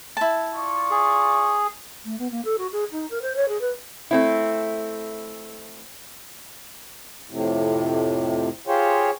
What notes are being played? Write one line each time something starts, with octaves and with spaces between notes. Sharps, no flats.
E4 A5
F4 D5 C#6
G#4
A3
B3
A#3
A4
F#4
G#4
D#4
A#4
C5
C#5
G#4
B4
A3 C4 E4
F2 A2 C3
F4 G4 G#4 C5 C#5